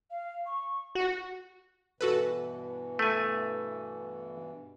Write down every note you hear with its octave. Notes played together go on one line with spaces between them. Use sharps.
F5
C#6
F#4 C#6
G2 B2 E3 F#4 A4 B4
A3 G#5